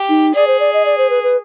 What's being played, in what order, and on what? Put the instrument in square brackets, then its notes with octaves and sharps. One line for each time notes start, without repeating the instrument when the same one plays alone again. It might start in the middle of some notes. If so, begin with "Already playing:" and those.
Already playing: [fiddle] G4
[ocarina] D#4
[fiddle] G#4 [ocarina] D5
[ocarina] C5
D5
D#5
D5
C5
B4
B4